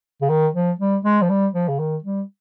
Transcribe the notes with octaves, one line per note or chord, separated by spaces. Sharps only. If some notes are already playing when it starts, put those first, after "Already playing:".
C#3
D#3
F3
G3
G#3
F3
G3
F3
C#3
D#3
G3